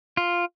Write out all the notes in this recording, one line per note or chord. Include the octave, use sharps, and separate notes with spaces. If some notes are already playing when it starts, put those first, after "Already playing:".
F4